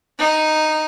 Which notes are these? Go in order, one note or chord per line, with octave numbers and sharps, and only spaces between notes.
D#4